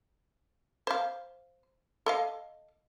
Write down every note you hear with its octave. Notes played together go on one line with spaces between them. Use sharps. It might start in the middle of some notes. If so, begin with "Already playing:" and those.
C5 F5
A4 D#5 F5